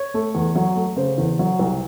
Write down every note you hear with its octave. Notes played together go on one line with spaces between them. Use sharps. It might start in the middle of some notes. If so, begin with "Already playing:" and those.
Already playing: C#5
A3
E2
F#3
A3
C#3 C5
E2
F#3
C2